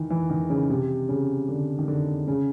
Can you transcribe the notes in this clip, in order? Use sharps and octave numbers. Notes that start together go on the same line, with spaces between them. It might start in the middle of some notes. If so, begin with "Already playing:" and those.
Already playing: D#3 E3
E3
D#3
C#3
C3
C#3
D3
D#3
D3
C#3